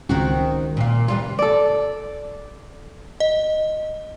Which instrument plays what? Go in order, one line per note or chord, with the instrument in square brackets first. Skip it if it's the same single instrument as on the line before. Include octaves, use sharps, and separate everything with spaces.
[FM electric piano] C#2 [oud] D#3 C4 F#4
[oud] A#2 F4
E3 G3 F4
[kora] A4 D5
[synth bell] D#5